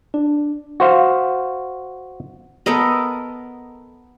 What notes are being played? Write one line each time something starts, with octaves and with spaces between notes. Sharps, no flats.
D4
F#4 C5 F5
B3 A4 A#4 D#5